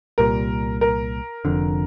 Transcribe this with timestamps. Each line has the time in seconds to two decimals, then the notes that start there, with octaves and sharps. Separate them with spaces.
0.18 C2 A#2 G3 A#4
0.81 A#4
1.45 F1 F2 D3